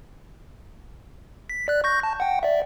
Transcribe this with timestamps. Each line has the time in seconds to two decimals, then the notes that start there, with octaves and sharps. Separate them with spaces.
1.49 B6
1.68 D5 F#6
1.84 C#6 G6 A#6
2.03 A5
2.20 F#5 G5
2.43 D5 E5